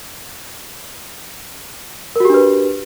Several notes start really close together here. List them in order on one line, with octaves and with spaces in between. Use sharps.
A#4 F#4 G4 D4 B4